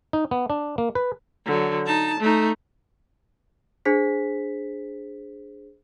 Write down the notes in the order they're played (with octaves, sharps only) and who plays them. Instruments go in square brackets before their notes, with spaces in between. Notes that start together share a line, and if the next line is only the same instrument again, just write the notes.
[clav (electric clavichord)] D#4
B3
D4
A#3
B4
[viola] D3 F#3
D#4 A5
A3 D#4
[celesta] D4 G#4 C5 B6